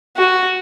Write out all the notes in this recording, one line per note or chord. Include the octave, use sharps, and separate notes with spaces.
F#4